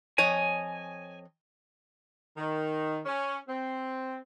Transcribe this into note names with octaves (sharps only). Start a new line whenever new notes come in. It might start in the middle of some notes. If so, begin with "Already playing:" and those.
F2 C#5 D#5 G#5
D#3
C#4
C4